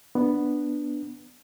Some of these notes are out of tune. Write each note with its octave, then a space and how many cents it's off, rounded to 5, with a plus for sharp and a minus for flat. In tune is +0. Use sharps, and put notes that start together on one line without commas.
B3 +0 D4 +5